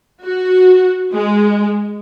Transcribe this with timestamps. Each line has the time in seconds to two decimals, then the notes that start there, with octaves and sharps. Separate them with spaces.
0.23 F#4
1.13 G#3